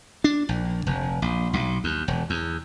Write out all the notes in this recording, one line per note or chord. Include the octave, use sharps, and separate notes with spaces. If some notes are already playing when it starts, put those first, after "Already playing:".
D4
A#1
F1
A#1
B1
D#2
E1
E2